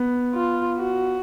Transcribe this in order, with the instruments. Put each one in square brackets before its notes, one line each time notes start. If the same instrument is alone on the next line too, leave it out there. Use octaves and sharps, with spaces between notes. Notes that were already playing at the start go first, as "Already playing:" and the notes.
Already playing: [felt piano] B3
[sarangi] F4
F#4